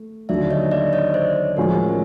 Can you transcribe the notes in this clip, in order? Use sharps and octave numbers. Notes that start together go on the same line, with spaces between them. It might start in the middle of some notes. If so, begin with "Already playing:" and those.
Already playing: A3
D#2 D3 F#3 D5 E5
C#5 D#5
D5 E5
C#5 D#5
C5 D5
A2 F3 G#3 C#4 F#4 A#4 C5
G#4 A#4